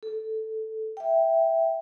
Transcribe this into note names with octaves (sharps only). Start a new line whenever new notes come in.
A4
E5 G5